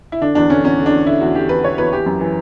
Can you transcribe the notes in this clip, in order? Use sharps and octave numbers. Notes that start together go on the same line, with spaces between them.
E4
D3 D4
E2 D4
D3 C#4
E2 C#4
D3
D4
E2
D3 E4
E2 F#4
D3 G4
E2 B4
D3 C#5
E2 B4
E3 G4
F#2
E3